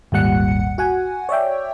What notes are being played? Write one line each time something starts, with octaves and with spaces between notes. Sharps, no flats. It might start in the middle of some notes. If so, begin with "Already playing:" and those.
G#1 D#2 A#2 G3 F#5 C#7
F#4 F#5 G#5
C#5 D5 E5 G5